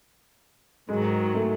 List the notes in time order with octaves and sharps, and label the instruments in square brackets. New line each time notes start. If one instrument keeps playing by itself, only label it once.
[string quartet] G#2 D#3 F#3 [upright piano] G#3
[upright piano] A3